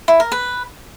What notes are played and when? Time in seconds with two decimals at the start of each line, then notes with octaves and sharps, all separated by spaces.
0.08 E4
0.20 A#4
0.32 B4